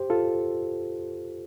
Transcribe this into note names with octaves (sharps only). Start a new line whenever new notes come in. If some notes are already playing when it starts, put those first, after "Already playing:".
Already playing: G4 C5
F4 A4